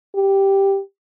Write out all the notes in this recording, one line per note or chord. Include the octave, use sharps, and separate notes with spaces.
G4